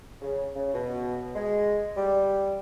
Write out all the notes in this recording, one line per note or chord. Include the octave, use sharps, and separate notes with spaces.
C#3
C#3
B2
G#3
G3